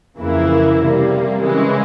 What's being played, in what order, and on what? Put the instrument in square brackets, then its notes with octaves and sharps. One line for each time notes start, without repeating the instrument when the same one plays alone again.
[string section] F2 C#3 E3 A#3 E4
C3 G3 A#3
C#3 E3 G#3 C#4